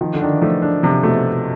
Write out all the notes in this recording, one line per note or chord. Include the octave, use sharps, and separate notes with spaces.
D#3 F3
D3
D#3 D4
E3
F3 A3
D4
C3 F3
B2 A3